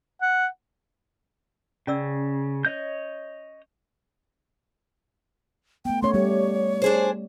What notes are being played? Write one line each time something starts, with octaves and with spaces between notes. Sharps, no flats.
F#5
C#3 C#4 D5 E6
C#5 D#5 G6
A3 B3 G5
A3 C#4 C#5 C6
G3 G4 C#5
D4 G#4 C5